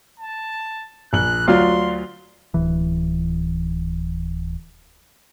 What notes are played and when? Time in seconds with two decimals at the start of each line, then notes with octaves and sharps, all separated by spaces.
0.20 A5
1.13 A#1 F#6 F#7
1.48 D2 F#3 F4 D5 F5 C6 F6
2.54 D1 E3